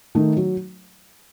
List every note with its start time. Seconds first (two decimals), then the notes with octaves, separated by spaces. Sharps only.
0.15 D#3 A3 D#4
0.37 F#3